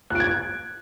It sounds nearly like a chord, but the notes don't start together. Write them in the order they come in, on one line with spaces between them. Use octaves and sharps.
F#6 D7 G#6